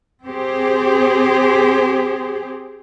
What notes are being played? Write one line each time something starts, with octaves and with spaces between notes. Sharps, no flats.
C4 G4 G#4 C5